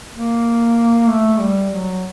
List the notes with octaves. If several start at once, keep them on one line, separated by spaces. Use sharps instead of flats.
A#3
A3
G3
F#3